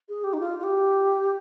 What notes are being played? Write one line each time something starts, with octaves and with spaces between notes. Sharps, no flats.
G#4
G4
D#4
F4
F4
G4